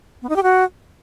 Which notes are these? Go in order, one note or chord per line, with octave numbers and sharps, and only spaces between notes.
B3
D#4
G4
F#4